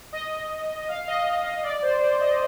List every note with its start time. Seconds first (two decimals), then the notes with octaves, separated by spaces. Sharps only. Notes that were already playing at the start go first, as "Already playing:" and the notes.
0.12 D#5
0.88 F5
1.08 D#5
1.63 D5
1.82 C5
2.01 C5
2.21 D#5